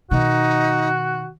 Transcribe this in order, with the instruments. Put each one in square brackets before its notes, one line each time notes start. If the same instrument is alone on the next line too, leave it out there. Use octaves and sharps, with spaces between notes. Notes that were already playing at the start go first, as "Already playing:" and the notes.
[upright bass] B2 D#3 [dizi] D#4 [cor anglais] F#4